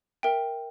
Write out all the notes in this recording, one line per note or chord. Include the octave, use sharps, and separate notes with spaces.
A#4 E5 G5